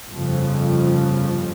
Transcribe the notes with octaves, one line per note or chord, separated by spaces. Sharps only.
G1 F2 C#3 F3